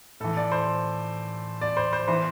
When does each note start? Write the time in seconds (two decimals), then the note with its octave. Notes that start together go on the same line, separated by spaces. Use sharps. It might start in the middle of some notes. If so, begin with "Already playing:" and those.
0.20 A2 E3 A4
0.37 D5
0.52 C5
1.61 D5
1.77 C5
1.93 C5
2.08 E3 C5